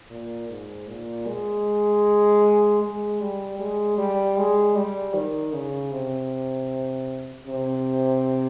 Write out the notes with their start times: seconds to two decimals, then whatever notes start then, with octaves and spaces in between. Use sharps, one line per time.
0.10 A#2
0.49 G#2
0.89 A#2
1.27 G#3
2.82 G#3
3.21 G3
3.59 G#3
3.98 G3
4.38 G#3
4.76 G3
5.14 D#3
5.53 C#3
5.92 C3
7.47 C3